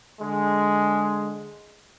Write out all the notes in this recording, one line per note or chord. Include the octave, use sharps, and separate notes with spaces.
D3 G#3